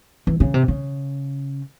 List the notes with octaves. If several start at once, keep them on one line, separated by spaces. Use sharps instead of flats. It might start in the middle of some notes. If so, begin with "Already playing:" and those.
E3
C#3
C3
C#3